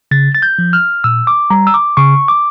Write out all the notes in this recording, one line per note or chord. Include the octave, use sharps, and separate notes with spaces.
C#3 A6
A6
G6
F3
F6
A#2 E6
D6
G3 A#5
E6
D6
C#3 C#6
D6